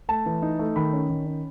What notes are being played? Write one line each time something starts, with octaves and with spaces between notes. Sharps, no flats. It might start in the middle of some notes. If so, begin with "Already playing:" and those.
A3 A5
E3
D#4
A3
D#3 B5
C#4
D#3
C#4